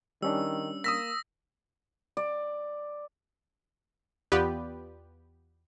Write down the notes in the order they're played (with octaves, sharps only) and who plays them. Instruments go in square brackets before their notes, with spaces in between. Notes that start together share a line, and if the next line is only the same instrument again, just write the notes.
[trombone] D#3 [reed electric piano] G3 C#4 D4 [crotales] E6
[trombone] A#3 [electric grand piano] D#6 E6 B6 [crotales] A#6
[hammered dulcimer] D5
[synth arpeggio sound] E2 B3 F4 G4 B4 D5